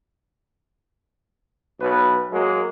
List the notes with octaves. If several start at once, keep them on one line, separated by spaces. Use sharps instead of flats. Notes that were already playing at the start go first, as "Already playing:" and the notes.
B1 B4
F#3 G#3 A#3